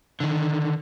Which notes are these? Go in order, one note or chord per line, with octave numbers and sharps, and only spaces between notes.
D3 D#3